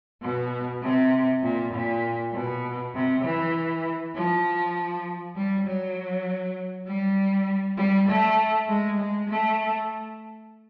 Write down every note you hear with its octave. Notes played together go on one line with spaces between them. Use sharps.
B2
C3
A#2
A#2
B2
C3
E3
F3
G3
F#3
G3
G3
A3
G#3
G#3
A3